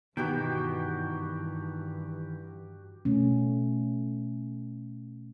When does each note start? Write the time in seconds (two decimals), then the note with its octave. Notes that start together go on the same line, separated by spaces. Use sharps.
0.17 G2 B2 D#3 E3 F#4 G4 G5
3.05 B2 A3 C#4